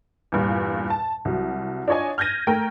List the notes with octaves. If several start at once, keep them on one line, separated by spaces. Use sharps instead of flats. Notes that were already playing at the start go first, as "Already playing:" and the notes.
E2 G2 A#2
A5
C2 F#3
D4 F4 C#5 D#5 G#5
F6 G6 G#6 A#6 D#7
A3 A#4 G5